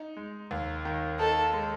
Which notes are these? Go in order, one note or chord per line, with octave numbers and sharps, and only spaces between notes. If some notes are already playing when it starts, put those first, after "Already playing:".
Already playing: D#4
G#3
D#2
D#3
D#4 A4
G#3